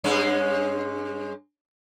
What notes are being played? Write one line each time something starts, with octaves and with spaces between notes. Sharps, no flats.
G2 G#3 C#4